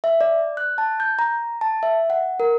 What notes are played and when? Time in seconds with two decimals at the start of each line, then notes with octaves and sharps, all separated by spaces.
0.04 E5
0.21 D5
0.57 F#6
0.78 A5
1.00 G6
1.19 A#5
1.61 A5
1.83 E5
2.10 F#5
2.40 A#4